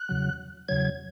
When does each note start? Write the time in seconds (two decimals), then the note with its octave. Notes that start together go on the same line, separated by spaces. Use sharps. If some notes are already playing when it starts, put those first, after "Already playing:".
Already playing: F#6
0.09 E2 C#3 F#3
0.69 E2 C#3 F#3 G#6